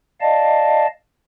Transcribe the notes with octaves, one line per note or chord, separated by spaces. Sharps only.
D5 D#5 F5 A5